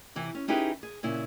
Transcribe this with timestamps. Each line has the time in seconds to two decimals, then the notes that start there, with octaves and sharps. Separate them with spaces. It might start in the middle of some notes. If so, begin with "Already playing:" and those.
0.16 C3 E3
0.35 C#4
0.48 C#4 D#4 E4 G4 G#4 B4
0.83 G#4
1.03 A#2 C#3 E4